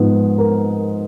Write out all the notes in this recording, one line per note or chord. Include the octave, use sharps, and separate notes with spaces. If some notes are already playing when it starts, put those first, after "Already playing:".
Already playing: G#2 F3 B3
A#4